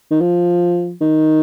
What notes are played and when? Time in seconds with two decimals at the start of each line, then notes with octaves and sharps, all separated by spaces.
0.11 D#3
0.21 F3
1.01 D#3